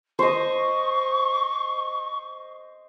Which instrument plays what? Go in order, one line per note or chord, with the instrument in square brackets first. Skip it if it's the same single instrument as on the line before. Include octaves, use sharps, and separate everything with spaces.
[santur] C5 D#5 [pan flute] C#6